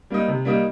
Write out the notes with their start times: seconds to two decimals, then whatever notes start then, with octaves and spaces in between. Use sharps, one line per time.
0.10 G3 A#3 D#4
0.28 C3
0.45 G3 A#3 D#4